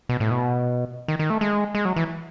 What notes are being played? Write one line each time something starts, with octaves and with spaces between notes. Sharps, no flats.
B2
A2
B2
D#3
D#3
A3
G#3
G#3
F#3
E3